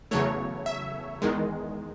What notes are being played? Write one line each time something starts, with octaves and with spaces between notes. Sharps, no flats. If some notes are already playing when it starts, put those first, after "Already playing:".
E2 C#3 F#3 A3 C#5
E5
E2 D#3 G#3